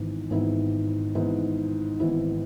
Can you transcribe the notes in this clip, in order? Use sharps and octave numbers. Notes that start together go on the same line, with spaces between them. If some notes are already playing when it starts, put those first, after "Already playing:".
Already playing: G#1 G#2 E3 B3
G#1 G#2 E3 B3 E4
G#1 G#2 E3 B3 E4
G#1 G#2 E3 B3 E4